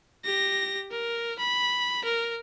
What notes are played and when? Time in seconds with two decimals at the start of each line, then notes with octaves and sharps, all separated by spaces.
0.25 G4 A#6
0.91 A#4
1.39 B5
2.05 A#4